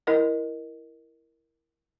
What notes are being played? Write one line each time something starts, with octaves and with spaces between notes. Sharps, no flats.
E4 A#4 D#5